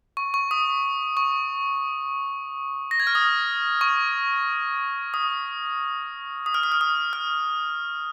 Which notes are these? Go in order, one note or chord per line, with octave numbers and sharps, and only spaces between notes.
C#6
C#6
D#6
C#6
A#6
G#6
F6
D#6
C#6
D#6
D#6
F6
D#6
F6
D#6
F6